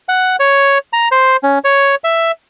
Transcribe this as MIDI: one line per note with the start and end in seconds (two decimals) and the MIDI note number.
0.09 0.36 78
0.40 0.78 73
0.93 1.08 82
1.11 1.37 72
1.43 1.59 61
1.64 1.95 73
2.04 2.32 76